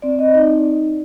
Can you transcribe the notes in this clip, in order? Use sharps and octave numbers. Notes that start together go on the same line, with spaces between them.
C4 D5
D#5
D#4 D5